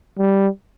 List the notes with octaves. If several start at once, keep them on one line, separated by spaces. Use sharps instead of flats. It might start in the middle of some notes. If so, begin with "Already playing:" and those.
G3